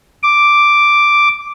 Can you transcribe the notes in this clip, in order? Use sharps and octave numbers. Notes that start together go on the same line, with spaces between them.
D6